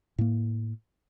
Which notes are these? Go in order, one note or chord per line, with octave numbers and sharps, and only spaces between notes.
A2 A#3